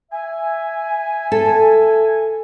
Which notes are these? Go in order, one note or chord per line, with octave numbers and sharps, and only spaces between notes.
E5 G#5
A4